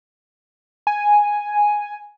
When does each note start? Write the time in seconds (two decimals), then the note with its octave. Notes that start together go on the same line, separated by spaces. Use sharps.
0.87 G#5